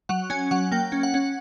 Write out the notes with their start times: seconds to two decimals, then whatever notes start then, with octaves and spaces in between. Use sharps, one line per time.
0.09 F#3 F#5
0.30 C#4 G#5
0.51 F#3 F#5
0.72 A#3 G5
0.92 C#4
1.03 F#5
1.14 C#4